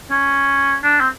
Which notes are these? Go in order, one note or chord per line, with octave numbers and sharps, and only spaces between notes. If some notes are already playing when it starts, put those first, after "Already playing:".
C#4
D4
C4